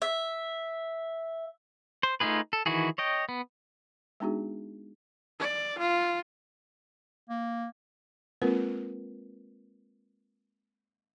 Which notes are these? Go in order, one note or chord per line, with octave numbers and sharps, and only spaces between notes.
E5
C5
A3 D#4 F4 G#4 B4
A4
D#3 E3 E4 F#4 G#4
C#5 D#5 G5
B3
G#3 B3 D4 D#4 F#4 G#4
D5
F4
A#3
G#3 A#3 C4 F4 A#4 B4